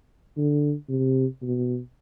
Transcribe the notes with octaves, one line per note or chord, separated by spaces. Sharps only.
D3
C3
B2